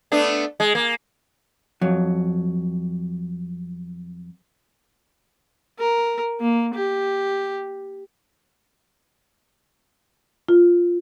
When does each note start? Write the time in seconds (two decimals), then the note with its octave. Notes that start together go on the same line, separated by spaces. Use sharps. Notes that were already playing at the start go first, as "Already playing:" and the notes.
0.12 A3 B3 D4
0.60 G#3
0.75 A#3
1.81 F2 F#3
5.79 A#4
6.41 A#3
6.74 G4
10.49 F4